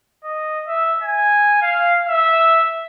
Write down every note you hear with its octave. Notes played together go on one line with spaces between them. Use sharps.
D#5
E5
G#5
F5
E5